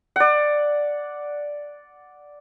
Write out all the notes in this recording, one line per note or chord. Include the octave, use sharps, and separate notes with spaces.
D5 F#5